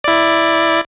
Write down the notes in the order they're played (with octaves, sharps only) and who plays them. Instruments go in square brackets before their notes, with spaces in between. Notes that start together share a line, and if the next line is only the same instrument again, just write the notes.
[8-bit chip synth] E4 D5